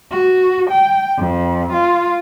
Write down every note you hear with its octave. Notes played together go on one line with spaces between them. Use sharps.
F#4
G5
F2
F4